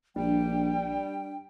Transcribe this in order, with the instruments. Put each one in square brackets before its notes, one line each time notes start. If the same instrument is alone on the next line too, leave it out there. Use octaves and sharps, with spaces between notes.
[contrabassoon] A#1 [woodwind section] G3 [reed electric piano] D4 [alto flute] G5